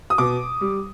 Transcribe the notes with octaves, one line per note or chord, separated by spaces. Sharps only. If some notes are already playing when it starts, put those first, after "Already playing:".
D#6
B2 D6
G3